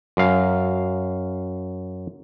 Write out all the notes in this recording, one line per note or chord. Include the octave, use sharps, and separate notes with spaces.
F#2 F5